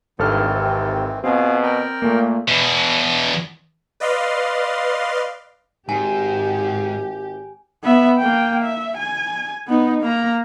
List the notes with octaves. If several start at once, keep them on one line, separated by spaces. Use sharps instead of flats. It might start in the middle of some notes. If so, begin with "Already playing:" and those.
G#1 G2 D#3 E3 C4 A4 F6
C3
B2 C4 F4 G#4 F5
A#4 D5 G5
A#2 A3 A#3
E2 B2
B4 D5 D#5 F5 C6
G#1 G#2 G4 G#5
B3 E5
A#3 G5
E5
G#5
B3 D#4
A#3 A#5